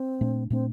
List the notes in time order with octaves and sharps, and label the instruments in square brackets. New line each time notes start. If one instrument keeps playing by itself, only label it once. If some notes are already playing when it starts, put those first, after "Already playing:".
Already playing: [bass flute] C4
[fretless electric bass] A#2 A3 D4
[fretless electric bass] A#2 A3 D4 [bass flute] C4